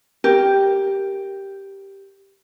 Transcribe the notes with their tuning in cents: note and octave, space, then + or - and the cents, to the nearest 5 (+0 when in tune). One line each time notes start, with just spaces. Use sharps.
G4 +0 A#4 +0